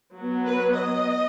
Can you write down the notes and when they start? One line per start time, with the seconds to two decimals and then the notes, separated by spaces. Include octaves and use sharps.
0.15 F#3 B3
0.45 B4
0.73 D#5